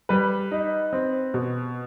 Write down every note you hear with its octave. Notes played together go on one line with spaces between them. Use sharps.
G3 B4
D#4
C4
B2